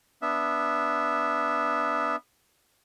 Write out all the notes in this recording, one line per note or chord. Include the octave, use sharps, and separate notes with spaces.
B3 D4 E5